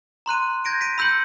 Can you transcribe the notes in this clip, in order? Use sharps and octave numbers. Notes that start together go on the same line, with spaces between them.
A#5 C6 F#6 D#7
G6 G#6 A#6 D7 D#7
B6 D7 D#7
B5 E6 G6 C#7 F#7